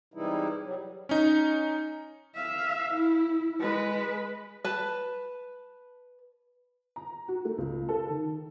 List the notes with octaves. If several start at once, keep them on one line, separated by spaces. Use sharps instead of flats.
C3 E3 G3 G#3 D#4 E4
F#3 G3
C#4 D#4
E5 F5
E4
G#3 B4
B4 A5
A#5
F#4
A3
C#2
A4
D#3